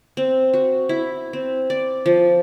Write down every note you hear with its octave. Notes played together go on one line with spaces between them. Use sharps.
C4
F#4
E4
C4
D5
F3